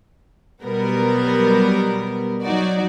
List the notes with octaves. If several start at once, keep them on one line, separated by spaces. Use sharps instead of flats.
B2 F#3 G3 B3 A#4
F#3 D#4 F#4 D5